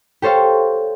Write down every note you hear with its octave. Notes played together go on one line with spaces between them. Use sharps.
G4 A4 C5 C#5 F5